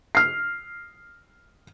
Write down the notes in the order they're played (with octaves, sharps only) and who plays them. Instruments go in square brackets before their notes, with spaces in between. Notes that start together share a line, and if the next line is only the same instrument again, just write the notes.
[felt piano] F6 C7